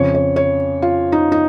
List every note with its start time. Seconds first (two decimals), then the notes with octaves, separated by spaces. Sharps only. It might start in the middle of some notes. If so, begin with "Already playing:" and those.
Already playing: F2 C#3 C#5
0.14 C#5
0.36 C#5
0.82 F4
1.12 D#4
1.32 D#4